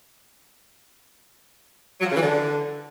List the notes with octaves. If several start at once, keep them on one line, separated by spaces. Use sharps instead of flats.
F#3
F3
C#3
E3
D3